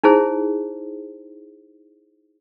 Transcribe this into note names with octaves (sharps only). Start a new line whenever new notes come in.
D#4 E4 G#4 C5